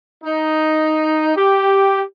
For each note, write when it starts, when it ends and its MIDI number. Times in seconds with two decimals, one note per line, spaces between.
0.24 1.33 63
1.37 2.01 67